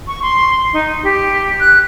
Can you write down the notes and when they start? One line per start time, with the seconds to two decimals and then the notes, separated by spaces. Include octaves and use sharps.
0.08 C#6
0.22 C6
0.73 D#4
1.03 G4
1.60 F#6